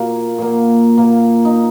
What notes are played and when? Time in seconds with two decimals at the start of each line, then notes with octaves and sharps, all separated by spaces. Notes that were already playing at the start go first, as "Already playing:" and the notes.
Already playing: A#2 A#3 F#4
0.38 A#2 A#3
0.97 A#2 A#3
1.45 D#4